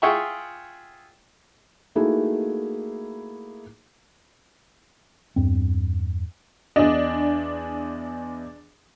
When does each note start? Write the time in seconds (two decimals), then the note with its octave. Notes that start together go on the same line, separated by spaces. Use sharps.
0.02 F4 G#4 E5 F#5 G5 C#6
1.95 A3 A#3 D#4 E4 F#4 G#4
5.36 E2 G2 C4
6.76 E2 D4 D#5